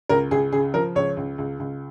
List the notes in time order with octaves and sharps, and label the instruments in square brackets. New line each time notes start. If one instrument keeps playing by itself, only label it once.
[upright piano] C#2 A#4
C#2 G#4
C#3 G#4
F3 A#4
C#2 C#5
C#2
C#2
C#2